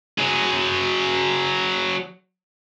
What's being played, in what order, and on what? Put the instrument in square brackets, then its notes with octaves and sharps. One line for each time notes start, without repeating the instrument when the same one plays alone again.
[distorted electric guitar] F#3 G#4